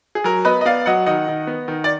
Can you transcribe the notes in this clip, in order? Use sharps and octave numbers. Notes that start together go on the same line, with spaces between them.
G#4
F#3 A#4
B3 B4 D#5
D#5
B3 D5 F5
F#3 D#5 F#5
D#3 D#5 F#5
D#3
B3
D#3
D5